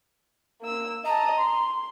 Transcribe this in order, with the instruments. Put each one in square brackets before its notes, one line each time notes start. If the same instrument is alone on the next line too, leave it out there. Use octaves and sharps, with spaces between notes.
[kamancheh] A#3 E6
[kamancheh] D#5 A5 [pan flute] A#5
[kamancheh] C6